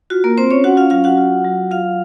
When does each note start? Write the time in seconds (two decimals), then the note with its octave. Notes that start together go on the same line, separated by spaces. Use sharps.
0.10 F4 F#4
0.24 A#3 A#4
0.37 C4 F4 C5
0.51 C#4 C#5
0.64 C#4 F#4 F#5
0.77 F4 F5
0.90 F#3 F4 F5
1.04 F#4 F#5
1.17 F4
1.44 F#3
1.71 F4 F5